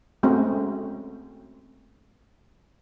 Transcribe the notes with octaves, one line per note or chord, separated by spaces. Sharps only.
G#3 A3 C4 C#4 F#4